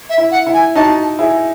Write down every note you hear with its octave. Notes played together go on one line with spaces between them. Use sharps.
E5
E4
F#5
E4
G#5
D#4 F#4 A5
E4 G#4